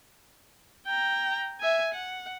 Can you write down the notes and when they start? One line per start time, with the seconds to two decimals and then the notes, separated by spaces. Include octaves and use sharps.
0.86 G5 A#5
1.60 E5 G#5
1.94 F#5